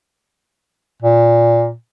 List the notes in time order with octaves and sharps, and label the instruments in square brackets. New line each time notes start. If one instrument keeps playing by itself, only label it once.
[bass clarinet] A#2